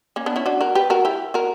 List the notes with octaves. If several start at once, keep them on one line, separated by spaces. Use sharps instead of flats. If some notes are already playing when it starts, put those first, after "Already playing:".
A#3 C#4
B3 D4
C#4 E4
D4 F#4
F#4 A#4
G4 B4
F#4 A#4
E4 G4
F#4 A#4